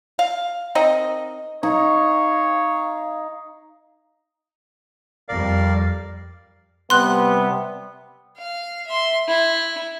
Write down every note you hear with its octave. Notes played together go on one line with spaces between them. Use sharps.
F5
C4 D#4 A#4 D#5
D#4 C#5 F5
F2 G3 A#4 D5 F5
C3 G3 B3 C6 F#6
F5
E5 C6
E4